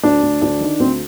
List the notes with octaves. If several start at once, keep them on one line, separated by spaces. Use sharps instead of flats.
D2 D4
D2
D2 D4
D#3
D2 C4